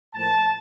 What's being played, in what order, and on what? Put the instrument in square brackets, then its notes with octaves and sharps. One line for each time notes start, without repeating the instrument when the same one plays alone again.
[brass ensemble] A2 F3 A#3 A5